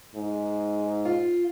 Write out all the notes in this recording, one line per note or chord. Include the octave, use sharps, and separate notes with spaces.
G#2
F4